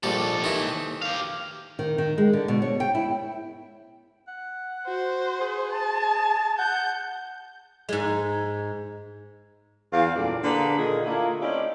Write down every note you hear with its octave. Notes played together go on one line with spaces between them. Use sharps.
A#1 D#2 G3 A4
D#3 E3
G4 F5
D#3
D#3
G#3
D3
B2
C#5
G5
E4
F#5
F#4 C5
G#4
A5
F#5 G6
G#2 G#3
E2 B3 F5
F#2 A#2 D3 G3 D5
D3 A#3 G#4 B4 D5
A#2 D3 D#3 G#4 A#4
A3 A#3 D4 E4 F4
C4 C#4 D#4 E4 G4 D5